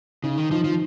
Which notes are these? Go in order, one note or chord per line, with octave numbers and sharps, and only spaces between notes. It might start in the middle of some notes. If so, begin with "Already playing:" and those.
C#3 D#4
D#3
F3 D#4
F3